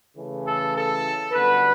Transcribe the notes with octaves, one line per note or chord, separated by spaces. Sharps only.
C#3 E3 A3
A4
A4
F#2 D3 G3 B3 B4